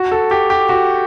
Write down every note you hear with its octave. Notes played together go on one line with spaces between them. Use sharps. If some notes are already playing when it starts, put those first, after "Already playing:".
Already playing: F#4
A4
G4
G4
F#4